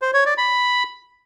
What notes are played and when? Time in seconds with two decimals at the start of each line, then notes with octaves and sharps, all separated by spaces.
0.02 C5
0.14 C#5
0.26 D5
0.38 B5